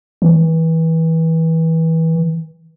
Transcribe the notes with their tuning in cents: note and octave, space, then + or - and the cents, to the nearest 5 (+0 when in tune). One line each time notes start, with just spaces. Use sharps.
E3 -25